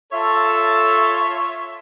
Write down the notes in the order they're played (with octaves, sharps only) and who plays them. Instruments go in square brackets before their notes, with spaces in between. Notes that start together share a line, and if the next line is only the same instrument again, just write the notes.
[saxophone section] F4 C#5 E5 [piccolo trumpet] A4